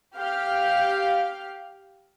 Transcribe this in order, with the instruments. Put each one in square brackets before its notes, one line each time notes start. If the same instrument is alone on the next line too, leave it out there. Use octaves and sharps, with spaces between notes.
[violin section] G4 F5 F6